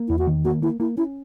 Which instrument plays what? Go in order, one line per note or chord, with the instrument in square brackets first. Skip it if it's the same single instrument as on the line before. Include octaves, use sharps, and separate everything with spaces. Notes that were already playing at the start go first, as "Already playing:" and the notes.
Already playing: [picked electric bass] A#3
[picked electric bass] E2 [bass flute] E4
[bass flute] F#4
[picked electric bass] D#3
[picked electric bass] A#3 [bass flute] F#4
[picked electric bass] A#3 [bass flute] E4
[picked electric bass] A#3 [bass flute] E4
[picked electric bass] C#4 [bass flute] E4